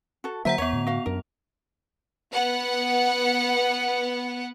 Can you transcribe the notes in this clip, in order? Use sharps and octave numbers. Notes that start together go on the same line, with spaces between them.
F#4 A4
D3 F#3 A#3 C5 E5 F#5 A#5 B6
E2 B3 C#5 F#5 F7
A2 D3
F#4 F5
F#2 D4 A#4
B3 F#5